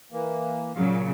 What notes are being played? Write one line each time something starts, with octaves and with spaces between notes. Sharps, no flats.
E3 A#3
A#2 C#3 F#3 F5